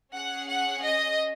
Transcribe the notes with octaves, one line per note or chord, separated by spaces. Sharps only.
C#4 G#4 F#5
F#5
D#5